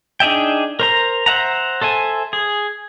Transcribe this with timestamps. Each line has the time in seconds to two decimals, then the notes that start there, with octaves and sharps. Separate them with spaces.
0.20 D4 D#4 G#4 E5 G5
0.80 A#4 C5 A#5
1.26 C5 E5 F#5 A#5
1.82 A4 C5 E5 G#5
2.33 G#4